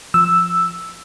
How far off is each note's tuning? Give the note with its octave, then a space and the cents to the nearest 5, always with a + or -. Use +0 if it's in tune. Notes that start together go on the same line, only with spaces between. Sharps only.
F3 +0 E6 +0